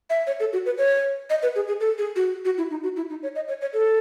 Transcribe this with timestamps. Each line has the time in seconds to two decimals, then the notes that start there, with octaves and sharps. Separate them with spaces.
0.10 E5
0.27 C#5
0.40 A4
0.53 F#4
0.66 B4
0.78 C#5
1.30 D#5
1.43 B4
1.56 G#4
1.68 G#4
1.81 A4
1.98 G#4
2.16 F#4
2.45 F#4
2.58 E4
2.71 D#4
2.83 F#4
2.96 E4
3.10 D#4
3.23 C#5
3.35 D#5
3.48 C#5
3.61 C#5
3.73 A4